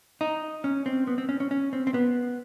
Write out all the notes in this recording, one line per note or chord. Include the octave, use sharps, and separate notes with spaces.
D#4
C#4
C4
B3
C4
C#4
C#4
C#4
C4
C4
B3